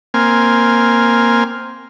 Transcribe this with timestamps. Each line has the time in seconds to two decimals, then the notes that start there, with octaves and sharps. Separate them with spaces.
0.14 A#3 C4 G#5 F6